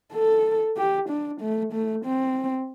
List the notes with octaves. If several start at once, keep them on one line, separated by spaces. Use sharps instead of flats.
A4
G4
D4
A3
A3
C4